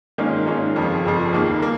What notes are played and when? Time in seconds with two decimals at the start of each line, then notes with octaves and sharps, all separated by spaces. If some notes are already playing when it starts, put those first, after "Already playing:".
0.18 G#2 D#3 A#3 C#4 F4
0.46 G#2 D#3 A#3 C#4 F4
0.76 G1 F2 C#3 F3
1.05 G1 F2 C#3 F3
1.33 D#2 D#3 A#3
1.62 A#3